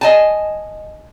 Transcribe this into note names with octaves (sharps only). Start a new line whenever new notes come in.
D#5 G#5 A5